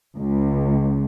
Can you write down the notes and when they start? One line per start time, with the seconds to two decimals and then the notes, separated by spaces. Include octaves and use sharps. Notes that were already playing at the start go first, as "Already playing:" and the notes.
0.17 C#2